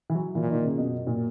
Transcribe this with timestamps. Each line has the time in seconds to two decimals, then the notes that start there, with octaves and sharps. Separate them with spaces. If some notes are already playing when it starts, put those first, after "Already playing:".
0.10 E3
0.15 F#3
0.35 A#2 E3
0.50 D#3
0.64 C#3
0.78 F#2 B2
1.07 A#2